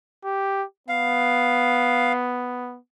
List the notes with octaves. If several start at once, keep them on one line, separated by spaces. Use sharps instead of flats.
G4
B3 F5